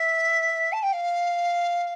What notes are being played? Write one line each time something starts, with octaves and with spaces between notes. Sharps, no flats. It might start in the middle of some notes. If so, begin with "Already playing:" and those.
Already playing: E5
A5
G5
F5